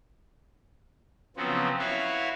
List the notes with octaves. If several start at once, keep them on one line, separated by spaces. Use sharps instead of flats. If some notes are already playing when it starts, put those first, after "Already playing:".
C#3 F3 F#3 B3 C4
E4 F#4 B4 C#5 E5 F5